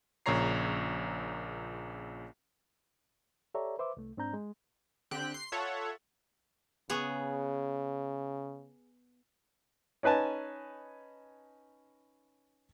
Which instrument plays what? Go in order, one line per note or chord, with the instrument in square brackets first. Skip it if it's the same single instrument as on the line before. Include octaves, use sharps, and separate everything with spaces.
[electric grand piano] A#1 A#2 C#3 C#5 A#5 C7
[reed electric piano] G4 A4 C#5 D5 E5 A#5
B4 C5 E5 D6
C2 A3
G#2 C4 D4 A#5 G6
G#3
[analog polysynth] D3 C4 G4 G5 F#6
C6 C7
F4 A4 C#5 E5 F#5
[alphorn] C#3 [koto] B3 G#4 C#5
[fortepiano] C#4 D#4 B4 G#5 A5